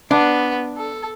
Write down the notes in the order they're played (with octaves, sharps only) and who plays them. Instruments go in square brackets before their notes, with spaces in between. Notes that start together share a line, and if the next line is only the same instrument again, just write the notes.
[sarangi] B3 [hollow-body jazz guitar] D4
[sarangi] A4